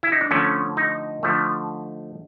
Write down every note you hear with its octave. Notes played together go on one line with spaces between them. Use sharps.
E4
D#4
D4
D3 F3 A3 C#4
D#4
D3 F3 A3